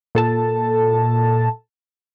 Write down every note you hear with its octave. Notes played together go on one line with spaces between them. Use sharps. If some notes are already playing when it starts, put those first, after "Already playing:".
A#2 A4 A5